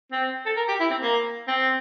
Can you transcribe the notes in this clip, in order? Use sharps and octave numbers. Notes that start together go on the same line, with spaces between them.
C4
A4
A#4
G4
E4
C4
A#3
C4